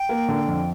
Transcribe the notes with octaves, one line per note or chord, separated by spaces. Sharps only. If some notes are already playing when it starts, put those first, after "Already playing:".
Already playing: G5
A#3
D3
F2